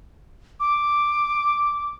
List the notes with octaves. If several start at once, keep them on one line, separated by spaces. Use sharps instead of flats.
D6